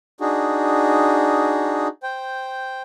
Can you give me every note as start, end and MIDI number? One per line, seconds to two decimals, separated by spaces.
0.20 1.88 62
0.20 1.88 63
0.20 1.88 66
0.20 1.88 68
2.03 2.82 72
2.03 2.82 79